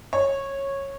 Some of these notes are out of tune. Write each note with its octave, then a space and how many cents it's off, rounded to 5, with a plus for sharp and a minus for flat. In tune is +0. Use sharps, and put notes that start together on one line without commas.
C#5 -15